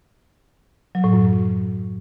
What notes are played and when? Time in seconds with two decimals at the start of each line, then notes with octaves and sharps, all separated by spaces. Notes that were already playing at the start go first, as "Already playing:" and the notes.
0.95 F#3
1.04 A2
1.13 F#2